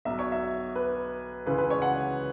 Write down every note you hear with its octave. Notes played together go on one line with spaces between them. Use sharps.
B1 B2 F#3 E5
C#5
E5
B4
C#2 C#3 E3 B4
B4
C#5
F#5